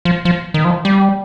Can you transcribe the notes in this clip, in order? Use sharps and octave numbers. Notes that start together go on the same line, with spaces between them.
F3
F3
D#3
F3
G3